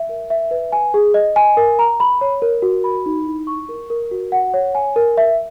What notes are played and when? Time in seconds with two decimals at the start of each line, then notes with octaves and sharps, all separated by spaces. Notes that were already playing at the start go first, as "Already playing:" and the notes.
Already playing: E5
0.09 A#4
0.30 E5
0.51 B4
0.72 G#5
0.94 G#4
1.14 D#5
1.36 G#5
1.57 A#4
1.79 A#5
2.00 B5
2.21 C#5
2.42 A#4
2.62 F#4
2.84 B5
3.06 D#4
3.26 E4
3.47 C#6
3.69 A#4
3.90 A#4
4.11 F#4
4.32 F#5
4.54 C#5
4.75 G#5
4.96 A#4
5.17 E5